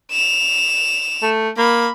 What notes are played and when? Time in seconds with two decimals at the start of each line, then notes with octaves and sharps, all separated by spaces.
0.12 E7 F7
1.23 A3
1.58 A#3 B5